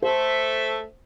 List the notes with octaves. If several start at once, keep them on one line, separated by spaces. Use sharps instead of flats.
A3 A4 C5 E5